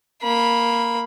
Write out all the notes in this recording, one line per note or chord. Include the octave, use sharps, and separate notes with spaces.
A#3 B5